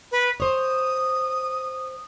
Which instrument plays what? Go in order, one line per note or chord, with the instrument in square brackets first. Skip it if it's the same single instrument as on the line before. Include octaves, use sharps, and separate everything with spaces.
[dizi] B4
[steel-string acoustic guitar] C5 C#5 [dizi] D#6